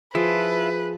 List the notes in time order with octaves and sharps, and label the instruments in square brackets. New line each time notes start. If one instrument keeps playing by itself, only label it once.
[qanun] F3 [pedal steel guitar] E4 F4 [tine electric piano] G#4 [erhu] B4